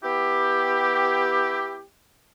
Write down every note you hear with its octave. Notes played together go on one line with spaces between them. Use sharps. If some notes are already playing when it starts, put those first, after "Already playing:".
B3 E4 G4